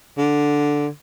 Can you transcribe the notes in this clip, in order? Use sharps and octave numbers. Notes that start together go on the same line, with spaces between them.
D3